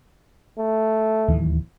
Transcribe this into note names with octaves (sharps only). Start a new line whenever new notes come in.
A3
D1 D#2 E3